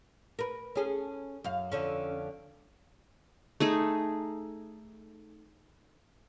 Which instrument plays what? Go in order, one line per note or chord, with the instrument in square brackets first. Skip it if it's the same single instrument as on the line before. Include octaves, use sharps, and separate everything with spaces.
[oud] A#4 B4
C#4 G#4 A4
F#2 F5
F2 D3 C#4
[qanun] A3 D#4 G#4